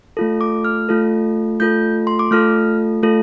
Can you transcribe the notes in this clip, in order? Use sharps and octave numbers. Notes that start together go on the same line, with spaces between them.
A3 F4 A4
D6
F6
A3 F4 A4
A3 F4 A4 G6
C6
D6
A3 F4 A4 F6
A3 F4 A4